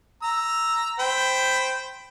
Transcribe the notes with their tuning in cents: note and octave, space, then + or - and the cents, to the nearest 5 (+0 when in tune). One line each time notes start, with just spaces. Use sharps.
A#5 +0 E6 +0
C5 +0 G5 +0 B5 +15